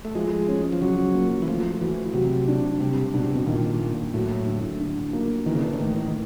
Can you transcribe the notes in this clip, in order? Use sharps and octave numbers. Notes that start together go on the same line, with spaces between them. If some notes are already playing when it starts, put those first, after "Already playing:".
A3
F3 G#3
C#4
F3
C#3 F#3
A#3
E3
F3 A3
E3 F#4
C3 F#3
D4
C3 G3
B2 D4
C3
B2
A#2 D#3
A#3
A2 F#3
D3
D3
A#3
D#3 E3
C#3
D3
D3
A2 D#3
D#3